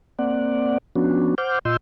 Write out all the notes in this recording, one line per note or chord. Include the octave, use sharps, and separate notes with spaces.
A#3 C4 D5 F#5
F3 B3 C#4 D4 F#4
C5 F#5 D6 F6 G6
A#2 F4 D#5 C6 E6 G6